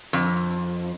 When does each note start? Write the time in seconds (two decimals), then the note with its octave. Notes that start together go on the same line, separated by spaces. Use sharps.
0.13 F2